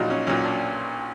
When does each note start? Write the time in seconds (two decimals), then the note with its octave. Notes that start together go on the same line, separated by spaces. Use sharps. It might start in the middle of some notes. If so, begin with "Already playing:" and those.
Already playing: A#1 A#2 F#3 D#4
0.10 C#4
0.27 B1 A#2 F#3 C#4
0.45 D4